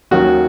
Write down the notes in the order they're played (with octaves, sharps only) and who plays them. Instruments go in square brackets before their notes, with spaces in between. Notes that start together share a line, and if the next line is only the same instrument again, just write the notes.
[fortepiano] D#2 D#3 F#3 C#4 F#4